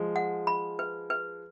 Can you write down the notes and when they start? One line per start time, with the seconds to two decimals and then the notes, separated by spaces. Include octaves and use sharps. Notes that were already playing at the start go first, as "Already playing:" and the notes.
Already playing: F3 G#3
0.16 F#5
0.47 B5
0.79 B4
1.10 B4